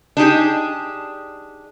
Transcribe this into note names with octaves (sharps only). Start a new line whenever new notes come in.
D4 D#4 G4 G#4